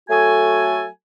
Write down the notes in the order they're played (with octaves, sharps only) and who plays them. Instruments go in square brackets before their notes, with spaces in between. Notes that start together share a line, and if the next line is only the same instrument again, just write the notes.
[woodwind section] F#3 A3 F#4 A4 G#5